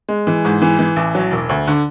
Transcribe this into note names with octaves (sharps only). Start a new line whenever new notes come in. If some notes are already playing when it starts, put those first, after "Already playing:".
G#3
E3
G#2
E3
E3
A1
F#3
E1
D2
D3